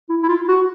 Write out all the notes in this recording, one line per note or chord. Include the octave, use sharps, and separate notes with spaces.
E4
E4
F4
F#4